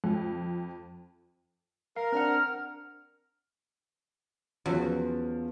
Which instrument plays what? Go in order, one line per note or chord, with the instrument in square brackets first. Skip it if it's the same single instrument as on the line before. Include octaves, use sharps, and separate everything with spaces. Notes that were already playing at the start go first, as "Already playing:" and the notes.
[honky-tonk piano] F2
[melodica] A#4 [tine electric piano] F5
[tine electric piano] C4 D4 F#5 [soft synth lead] F6
[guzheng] E2 [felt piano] F3 F#3 C#4